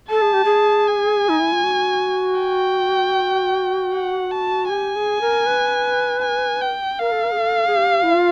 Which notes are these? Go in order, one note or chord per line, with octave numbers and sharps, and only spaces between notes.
A4 A5
G#4
G4
G#4
G#5
D#4
E4
F4
F#4
G5
F#5
A5
G4 G#5
G#4
A#4
B4
G#5
G5
A#4 F5
A4
A#4
G#4
A4
G#4
G4
E4
F4